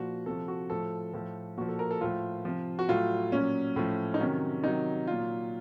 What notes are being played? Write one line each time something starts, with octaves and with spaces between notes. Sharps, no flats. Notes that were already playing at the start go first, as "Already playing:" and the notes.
Already playing: A#2 F3 F#4
C3 F3 A4
F#4
A2 F3 A4
A2 F3 A4
A#2 F3 F#4
A4
A#4
A4
A2 F3 F4
C3 F3
F#4
A2 F#3 F4
A#2 F#3 C#4
A2 F3
D#4
C3 D#3 F#3 C#4
C3 D#3 F#3 D#4
A#2 F#3 F4